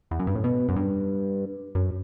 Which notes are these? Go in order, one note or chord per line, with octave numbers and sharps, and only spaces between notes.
E2
F#2
G2
A2
B2
F#2
G2
F#2